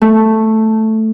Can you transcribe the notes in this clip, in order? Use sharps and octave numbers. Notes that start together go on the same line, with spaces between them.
A3